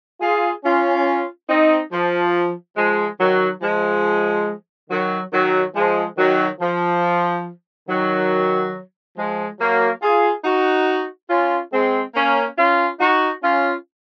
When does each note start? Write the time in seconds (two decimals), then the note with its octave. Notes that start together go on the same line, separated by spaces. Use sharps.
0.21 F4 G#4
0.63 C#4 F4
1.48 C4 D#4
1.92 F3
2.76 F3 G#3
3.19 D#3 F#3
3.62 F3 G#3
4.89 D#3 F#3
5.32 D#3 F#3
5.75 F3 G#3
6.17 D#3 F#3
6.60 F3
7.88 D#3 F#3
9.16 F3 G#3
9.59 F#3 A#3
10.01 F4 G#4
10.44 D#4 F#4
11.29 C#4 F4
11.72 G#3 C4
12.14 A#3 C#4
12.57 C#4 F4
13.00 D#4 F#4
13.42 C#4 F4